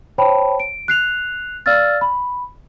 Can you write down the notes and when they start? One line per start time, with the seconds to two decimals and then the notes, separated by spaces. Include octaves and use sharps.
0.18 C5 C#5 G5 A5 B5
0.60 D7
0.88 F#6 C7 F7
1.66 D5 F5 E6 F6 A6
2.01 B5